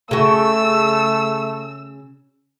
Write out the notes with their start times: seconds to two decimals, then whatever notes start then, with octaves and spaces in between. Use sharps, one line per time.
0.11 C#3 A3 F#4 E6